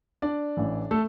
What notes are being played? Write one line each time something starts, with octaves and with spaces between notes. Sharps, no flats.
D4 D5
A1 A2 E3
A3 A4